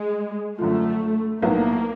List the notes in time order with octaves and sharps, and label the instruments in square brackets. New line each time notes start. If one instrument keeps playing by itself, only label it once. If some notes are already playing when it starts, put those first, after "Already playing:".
Already playing: [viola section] G#3
[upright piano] F#2 D3 F3 [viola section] A3
[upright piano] B1 A2 F#3 B3 E4 [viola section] A#3